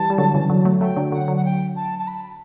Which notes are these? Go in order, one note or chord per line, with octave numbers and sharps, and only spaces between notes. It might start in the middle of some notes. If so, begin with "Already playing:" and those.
Already playing: E3 G3 A5
G3
D3 F#3
C#3 E3
D3 F#3
F#3 A3
F#5
F#3 A3 G5
D3 F#3
D3 F#3 F#5
D3 F#3
F#5
G5
A5
A5
B5